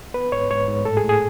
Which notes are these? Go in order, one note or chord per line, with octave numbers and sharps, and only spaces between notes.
B3 B4
G#2 C#5
G#2 C#5
G#2
A2 A4
G#4
A2
G#4